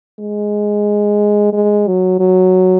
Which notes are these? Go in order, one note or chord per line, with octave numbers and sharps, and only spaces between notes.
G#3
G#3
F#3
F#3